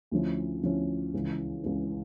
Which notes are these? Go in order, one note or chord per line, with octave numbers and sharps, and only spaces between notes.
D2 D3 F3 C#4 E4
D2 D3 F3 C#4 E4
C#2 C#3 E3
C#2 C#3 E3